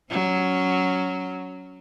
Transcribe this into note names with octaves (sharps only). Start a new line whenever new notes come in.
F#3 C#4